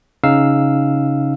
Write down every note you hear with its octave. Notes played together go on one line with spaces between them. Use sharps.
C#3 C#4 D#4 F5 E6